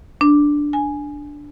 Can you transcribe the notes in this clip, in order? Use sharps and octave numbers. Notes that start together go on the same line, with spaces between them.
D4
G#5